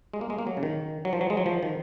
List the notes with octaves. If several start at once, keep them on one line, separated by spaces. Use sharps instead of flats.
G#3
A#3
G#3
A#3
F#3
C#3
D#3
F#3
F3
F#3
G#3
F#3
F3
D#3